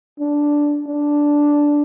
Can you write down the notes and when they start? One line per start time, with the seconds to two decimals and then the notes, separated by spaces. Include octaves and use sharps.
0.20 D4
0.87 D4